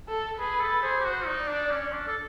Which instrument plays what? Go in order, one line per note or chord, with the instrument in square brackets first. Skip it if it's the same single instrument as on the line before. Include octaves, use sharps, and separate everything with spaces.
[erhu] A4
[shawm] G#4 [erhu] B4
[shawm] A4
[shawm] G#4 [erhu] C5
[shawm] G4
F#4
[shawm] D#4 [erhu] D5
[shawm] D4
C#4
D4
A4